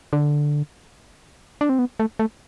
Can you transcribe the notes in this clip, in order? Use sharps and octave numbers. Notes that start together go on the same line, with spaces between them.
D3
D4
C4
B3
A3
A3